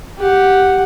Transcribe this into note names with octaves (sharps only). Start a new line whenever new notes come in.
G4 F#5